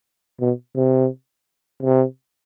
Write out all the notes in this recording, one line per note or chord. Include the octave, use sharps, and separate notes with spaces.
B2
C3
C3